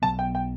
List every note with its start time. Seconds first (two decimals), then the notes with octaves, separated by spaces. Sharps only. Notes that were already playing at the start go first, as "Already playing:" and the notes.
0.02 B1 B2 F#3 B3 A5
0.19 G5
0.35 G5